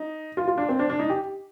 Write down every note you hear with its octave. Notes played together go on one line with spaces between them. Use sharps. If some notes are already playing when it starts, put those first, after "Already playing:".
Already playing: D#4
F4
F4
D4
C4
D4
D4
D#4
G4